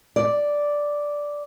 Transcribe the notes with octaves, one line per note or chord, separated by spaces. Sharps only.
D5